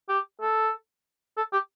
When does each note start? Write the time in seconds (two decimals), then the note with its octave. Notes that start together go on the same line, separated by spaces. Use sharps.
0.09 G4
0.41 A4
1.37 A4
1.53 G4